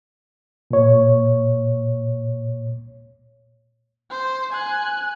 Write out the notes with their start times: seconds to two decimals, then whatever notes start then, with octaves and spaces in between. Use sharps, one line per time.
0.71 A#2 C#5
4.10 C5
4.53 G#5 F#6